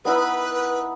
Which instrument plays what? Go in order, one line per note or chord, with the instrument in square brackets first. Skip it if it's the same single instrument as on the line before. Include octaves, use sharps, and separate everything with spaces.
[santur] B3 D#4 E4 [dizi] B4